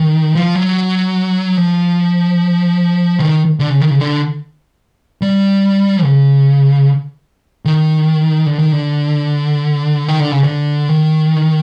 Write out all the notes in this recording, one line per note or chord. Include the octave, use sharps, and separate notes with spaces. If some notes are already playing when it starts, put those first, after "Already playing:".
Already playing: D#3
F3
F#3
F3
D#3
D3
C#3
D#3
C#3
D3
G3
C#3
D#3
D3
D#3
D3
D#3
D3
C#3
D3
D#3